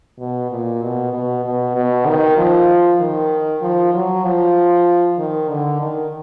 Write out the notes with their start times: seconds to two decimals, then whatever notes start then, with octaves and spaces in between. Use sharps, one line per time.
0.19 B2
0.51 A#2
0.82 B2
1.13 B2
1.44 B2
1.75 B2
2.06 D#3
2.38 F3
3.01 D#3
3.62 F3
3.94 F#3
4.24 F3
5.18 D#3
5.49 D3
5.81 D#3